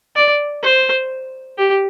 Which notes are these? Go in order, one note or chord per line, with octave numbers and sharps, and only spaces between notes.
D5
C5
G4